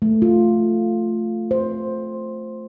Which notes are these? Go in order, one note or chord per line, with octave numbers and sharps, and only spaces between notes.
A3
F4
C5